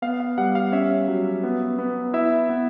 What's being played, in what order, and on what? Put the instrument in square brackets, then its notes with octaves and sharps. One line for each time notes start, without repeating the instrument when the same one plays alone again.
[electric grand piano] B3 F5
F5
G3 F#5
F5
C#4 E5
F#3
B3
B3
E4 E5
B3